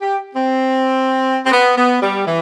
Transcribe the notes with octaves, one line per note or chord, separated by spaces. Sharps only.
G4
C4
C4
B3
B3
G3
E3